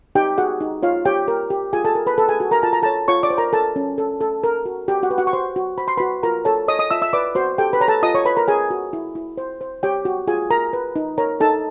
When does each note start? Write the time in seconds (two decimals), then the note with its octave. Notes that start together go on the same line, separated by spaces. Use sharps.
0.15 D#4 G4 G5
0.38 F#4 G#4 F#5
0.61 D#4
0.83 F4 C#5 F5
1.05 G4 C#5 G5
1.28 A#4
1.50 G4
1.73 F4 G#4 G#5
1.85 A4 A5
1.95 A#4
2.07 B4 B5
2.18 A4 B4 A5
2.29 G#4 G#5
2.40 F#4
2.51 A#4 A#5
2.63 F4 A5
2.73 A#5
2.82 A4 C#5 A5
3.08 F4 C#5 C#6
3.23 D5 D6
3.30 C5
3.38 A#4 A#5
3.53 A4 A#4 A5
3.76 C#4
3.98 A4
4.21 A4
4.44 A#4
4.65 F#4
4.88 F#4 G4 G5
5.03 F#4 F#5
5.11 B4
5.18 F#4 F#5
5.27 C#6
5.33 F#4 C5 C6
5.56 F#4
5.78 C5 B5
5.88 C6
5.97 F#4 B4 B5
6.23 F4 A#4 A#5
6.45 A4 C#5 A5
6.68 C#5 D#5 D#6
6.79 D#5 D#6
6.91 F4 E5 E6
7.02 E5 E6
7.13 B4 D5 D6
7.35 F#4 C5 C6
7.58 G4 A4 G5
7.73 B4 B5
7.81 C#5 A#5
7.88 A4 A5
8.03 F4 D#5 D#6
8.14 C#5 C#6
8.25 B4 C#5 B5
8.37 A#4 A#5
8.48 G#4 C#5 G#5
8.70 F#4
8.93 E4
9.15 E4
9.37 C5
9.61 C5
9.83 G4 C#5 G5
10.05 F#4
10.27 F4 G#4 G#5
10.50 A#4 A#5
10.73 B4
10.96 D#4
11.18 A#4 C#5 A#5
11.40 D#4 A4 A5